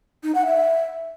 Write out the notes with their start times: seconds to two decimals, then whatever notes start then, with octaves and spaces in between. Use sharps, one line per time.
0.23 D#4
0.35 F#5
0.46 E5